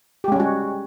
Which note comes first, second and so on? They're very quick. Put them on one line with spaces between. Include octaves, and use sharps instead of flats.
G4 G#3 C#4 G3 F#4